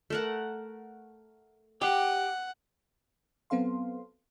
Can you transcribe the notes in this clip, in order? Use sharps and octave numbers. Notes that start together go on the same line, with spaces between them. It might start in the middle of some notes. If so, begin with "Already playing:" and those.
A3 A#4 F#5
G4 D#5 F#5
F#3 B3 C4 A4 F5 C6